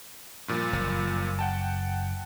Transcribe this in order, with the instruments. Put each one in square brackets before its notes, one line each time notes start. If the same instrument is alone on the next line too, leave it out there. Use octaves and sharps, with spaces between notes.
[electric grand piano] G2 A#2 F3
[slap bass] F#1
[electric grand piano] F#5 G5 A5